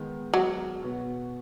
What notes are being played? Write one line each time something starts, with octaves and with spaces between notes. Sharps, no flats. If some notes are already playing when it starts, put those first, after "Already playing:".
Already playing: D#3 G#3 B3
F#3
B2 B3 F#4